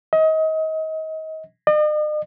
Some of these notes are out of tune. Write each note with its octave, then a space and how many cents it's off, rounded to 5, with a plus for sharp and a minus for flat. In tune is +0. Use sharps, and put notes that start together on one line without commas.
D#5 +30
D#5 -45